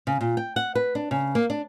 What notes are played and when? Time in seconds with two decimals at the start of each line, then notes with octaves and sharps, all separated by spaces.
0.07 C#3
0.21 A#2
0.37 G5
0.56 F#5
0.75 B4
0.95 D4
1.11 C#3
1.35 A#3
1.50 D4